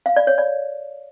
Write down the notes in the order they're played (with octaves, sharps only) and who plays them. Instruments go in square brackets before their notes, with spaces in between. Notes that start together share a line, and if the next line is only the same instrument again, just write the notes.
[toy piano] F5
D5
C#5
D5